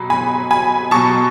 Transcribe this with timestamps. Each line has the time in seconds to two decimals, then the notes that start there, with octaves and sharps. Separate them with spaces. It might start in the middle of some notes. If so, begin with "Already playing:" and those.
Already playing: B2 F#3 B5
0.10 G#5 B5
0.51 G#5 B5
0.91 B2 F#3 A5 C#6